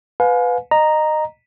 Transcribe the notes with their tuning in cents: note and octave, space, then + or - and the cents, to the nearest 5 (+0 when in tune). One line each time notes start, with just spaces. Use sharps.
B4 +10 F5 +35 G#5 +25
D#5 -20 A#5 +0